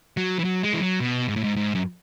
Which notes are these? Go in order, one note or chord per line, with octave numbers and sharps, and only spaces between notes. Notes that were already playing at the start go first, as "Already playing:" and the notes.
F#3
E3
F#3
G#3
E3
F#3
B2
G#2
A2
G#2
G#2
F#2